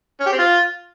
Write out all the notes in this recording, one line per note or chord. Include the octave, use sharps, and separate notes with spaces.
C#4
G4
C4
F4